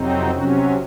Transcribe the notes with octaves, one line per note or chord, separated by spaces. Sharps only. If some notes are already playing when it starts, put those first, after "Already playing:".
Already playing: F2 C3 F#3 C4 D#4
C3 F#3 C#4 F#4